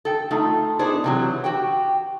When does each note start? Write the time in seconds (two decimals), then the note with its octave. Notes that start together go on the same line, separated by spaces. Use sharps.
0.05 A4 G5
0.31 A3 D#4 F4
0.79 B3 D4 D#4 G#4 C5
1.04 C3 E3 F#3
1.44 F#4 G4 G5